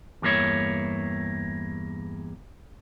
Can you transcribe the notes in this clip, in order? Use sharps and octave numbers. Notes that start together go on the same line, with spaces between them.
E2 G2 A#3 E4 C#5